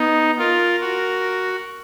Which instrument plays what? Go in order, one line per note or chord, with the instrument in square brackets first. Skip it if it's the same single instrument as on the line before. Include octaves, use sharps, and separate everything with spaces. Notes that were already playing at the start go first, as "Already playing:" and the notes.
Already playing: [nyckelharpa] B3 [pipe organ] D#4
[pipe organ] F4 [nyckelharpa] A#4
[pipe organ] F#4